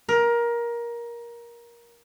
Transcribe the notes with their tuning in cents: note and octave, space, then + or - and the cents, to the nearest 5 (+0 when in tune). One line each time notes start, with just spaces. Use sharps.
A#4 +20